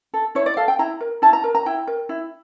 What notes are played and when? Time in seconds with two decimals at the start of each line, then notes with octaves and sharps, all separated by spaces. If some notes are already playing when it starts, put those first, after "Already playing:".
0.14 A4
0.35 E4 C#5
0.46 D5
0.57 A4 F5
0.68 G5
0.79 E4 A#5
1.01 A#4
1.22 E4 A5
1.33 A#5
1.44 A#4
1.55 A#5
1.66 E4 G5
1.87 A#4
2.09 E4